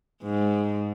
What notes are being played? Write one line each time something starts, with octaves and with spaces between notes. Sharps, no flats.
G#2